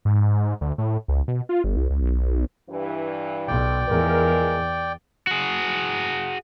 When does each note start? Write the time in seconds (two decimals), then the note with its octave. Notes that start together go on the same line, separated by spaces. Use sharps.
0.05 G#2
0.61 D2
0.78 A2
1.08 C#2
1.28 B2
1.49 F4
1.64 G1
1.77 C2
1.90 C#2
2.02 B1
2.69 G2 E3
3.48 B1 D5 G5
3.89 E2 F3 G#3 A#4
5.27 F#4 G#4